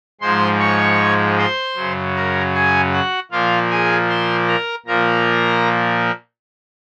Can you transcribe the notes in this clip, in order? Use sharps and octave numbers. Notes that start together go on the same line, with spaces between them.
G#2 F3 G#3 C5 C6
C#5 C#6
C5 C6
F#2 C#3 F#3
A#4 A#5
G#4 G#5
F#4 F#5
A#2 F3 A#3 F4 F5
G#4 G#5
C5 C6
A#4 A#5
A#2 F3 A#3 A#4 A#5